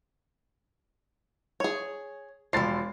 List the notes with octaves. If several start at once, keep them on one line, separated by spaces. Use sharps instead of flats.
G#4 C#5
E1 F3 D5 A6 C7